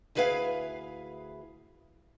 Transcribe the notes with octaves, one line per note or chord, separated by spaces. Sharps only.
D2 E4 G#4 B4 E5 F5